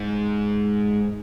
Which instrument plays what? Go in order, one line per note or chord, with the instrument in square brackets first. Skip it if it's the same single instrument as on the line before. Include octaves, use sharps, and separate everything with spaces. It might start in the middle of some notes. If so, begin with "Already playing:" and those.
Already playing: [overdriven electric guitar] G#2